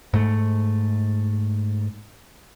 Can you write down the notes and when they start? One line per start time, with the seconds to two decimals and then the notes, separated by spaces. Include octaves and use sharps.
0.14 G#2 A3